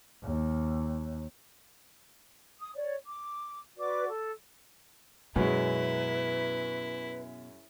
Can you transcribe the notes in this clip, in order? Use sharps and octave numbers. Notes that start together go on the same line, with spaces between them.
D#2
D#6
C#5 D5
D6
F#4 B4 D5 D6
A4
F#2 B2 F#3 G#3 E4 B4